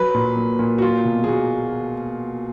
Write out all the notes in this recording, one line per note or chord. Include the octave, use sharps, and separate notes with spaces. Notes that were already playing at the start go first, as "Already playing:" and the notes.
Already playing: F#3 B4
A#2
A#3
A#2
F#4
F#3 F4
B2
G#4
A#3 F#4